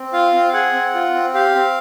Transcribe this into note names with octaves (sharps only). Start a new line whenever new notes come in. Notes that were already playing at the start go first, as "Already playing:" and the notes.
Already playing: C4
F4 F5
C4
G#4 F#5
C4
F4
C4
G4 F5
C4